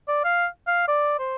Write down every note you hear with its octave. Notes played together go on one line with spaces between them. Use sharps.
D5
F5
F5
D5
C5